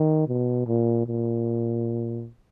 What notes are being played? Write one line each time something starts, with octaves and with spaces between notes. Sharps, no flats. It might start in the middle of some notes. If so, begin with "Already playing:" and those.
Already playing: D#3
B2
A#2
A#2